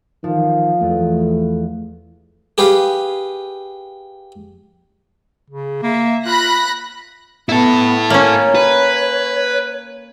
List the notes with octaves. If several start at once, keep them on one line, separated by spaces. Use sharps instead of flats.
D#3 F3
E2 A3
G4 G#4 B4 F5
C#3
A#3 E5
F4 B5 F#6 A#6
B3 E4 A4
A#3 C#4 C#5
B4